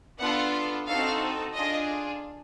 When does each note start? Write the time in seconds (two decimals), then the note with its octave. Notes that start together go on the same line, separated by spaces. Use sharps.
0.19 B3 D4 F4 A4 F#5
0.87 C4 D#4 F#4 A4 F5
1.55 D4 F4 G#4 D#5